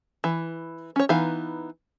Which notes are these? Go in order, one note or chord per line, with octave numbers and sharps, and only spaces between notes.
E3
C#4 C#5
E3 B3 D#4 F5